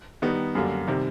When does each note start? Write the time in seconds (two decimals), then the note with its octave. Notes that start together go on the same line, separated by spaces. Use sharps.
0.22 D#3 G3 B3 D#4
0.55 F#2 D3 G3 A#3
0.87 C3 D#3 G3